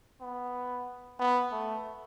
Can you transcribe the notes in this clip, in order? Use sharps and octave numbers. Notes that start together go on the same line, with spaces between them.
B3
B3
A3